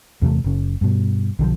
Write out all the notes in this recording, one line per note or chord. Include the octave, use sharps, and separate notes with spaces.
E2 C3 E3 A3
F#1 C#3
G2 B2
B1 D3 D#3 F3